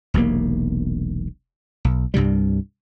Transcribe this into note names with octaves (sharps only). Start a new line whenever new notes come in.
E1 B1 C3 A#3
B1
C2 G2 C3 G3